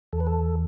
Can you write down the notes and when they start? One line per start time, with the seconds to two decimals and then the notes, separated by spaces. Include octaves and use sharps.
0.13 E2 A4
0.20 B4
0.27 A4